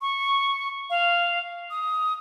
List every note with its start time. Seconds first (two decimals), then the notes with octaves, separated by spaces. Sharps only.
0.01 C#6
0.90 F5
1.70 D#6